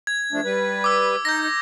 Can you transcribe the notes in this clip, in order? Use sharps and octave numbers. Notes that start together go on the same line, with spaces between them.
G#6
F3 A3 D4
G3 B4
D6 E6
D#4 G6 A#6